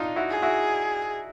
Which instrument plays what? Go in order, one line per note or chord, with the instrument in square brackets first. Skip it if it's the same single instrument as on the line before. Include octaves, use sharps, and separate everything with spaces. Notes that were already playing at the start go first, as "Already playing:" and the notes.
Already playing: [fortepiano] D4 D#4 F4
E4 F#4
[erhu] G#4
[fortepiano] E4 F#4